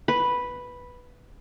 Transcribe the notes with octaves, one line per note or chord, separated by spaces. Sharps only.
B4